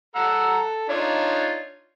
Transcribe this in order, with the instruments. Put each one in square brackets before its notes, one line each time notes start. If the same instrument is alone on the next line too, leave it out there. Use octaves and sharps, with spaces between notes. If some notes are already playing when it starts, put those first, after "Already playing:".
[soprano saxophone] A4 [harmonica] F#5 A#5 E6
[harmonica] D4 D#4 F4 [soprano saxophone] C#5